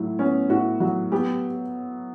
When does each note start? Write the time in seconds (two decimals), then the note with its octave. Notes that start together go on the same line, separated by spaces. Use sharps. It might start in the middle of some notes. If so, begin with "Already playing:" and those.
Already playing: A2 F#3
0.19 B3 C#4
0.49 A2 F#4
0.80 F#3 F#4
1.12 B3 G4